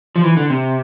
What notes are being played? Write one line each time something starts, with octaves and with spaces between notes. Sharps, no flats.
F3
E3
D3
C3